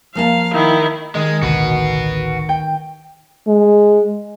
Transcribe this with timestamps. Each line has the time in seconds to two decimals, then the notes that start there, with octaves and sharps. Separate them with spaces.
0.15 F3 A#3 F5 A5
0.54 D#3 E4
1.15 D#3 G#3
1.42 A1 D2 D3 F#4 B4
2.49 G5
3.48 G#3